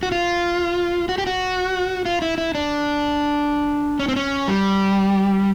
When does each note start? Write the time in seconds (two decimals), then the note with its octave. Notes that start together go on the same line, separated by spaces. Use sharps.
0.03 F#4
0.12 F4
1.09 F#4
1.18 G4
1.27 F#4
2.06 F4
2.22 E4
2.38 E4
2.55 D4
3.99 C#4
4.08 C4
4.16 C#4
4.48 G3